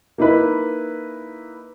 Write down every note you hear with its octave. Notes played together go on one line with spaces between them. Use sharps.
A#3 D#4 E4 B4